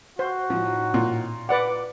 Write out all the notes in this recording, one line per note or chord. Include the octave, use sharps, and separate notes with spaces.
F#4 C5
A2 F3 D#4
A#2
B4 D5 F#5 D6